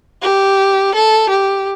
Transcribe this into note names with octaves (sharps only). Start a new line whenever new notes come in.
G4
A4
G4